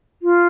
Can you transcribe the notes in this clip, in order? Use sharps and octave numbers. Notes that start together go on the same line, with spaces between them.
F4